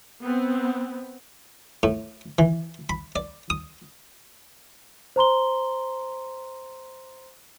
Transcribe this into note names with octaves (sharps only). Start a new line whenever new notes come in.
B3 C4
A2
E3
B5
D5
D#6
C5 A#5 C6 G7